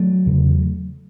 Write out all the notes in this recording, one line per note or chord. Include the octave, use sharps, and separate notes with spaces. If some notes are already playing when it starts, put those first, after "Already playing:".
Already playing: F#3 A3
E2 C#3